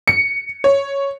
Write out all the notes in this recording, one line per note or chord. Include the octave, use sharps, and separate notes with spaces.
C#7
C#5